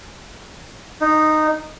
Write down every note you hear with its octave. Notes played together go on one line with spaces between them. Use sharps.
D#4